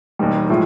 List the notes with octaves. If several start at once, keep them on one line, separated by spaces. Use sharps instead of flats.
E1 D#2 D#3 G3
A2 F3 G#3